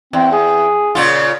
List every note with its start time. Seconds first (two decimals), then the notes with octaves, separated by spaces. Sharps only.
0.13 E2 C4
0.33 G#4
0.95 A#2 C#3 F4